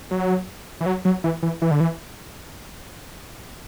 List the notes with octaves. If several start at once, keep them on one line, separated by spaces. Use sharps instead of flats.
F#3
E3
F#3
F#3
E3
E3
E3
D3
E3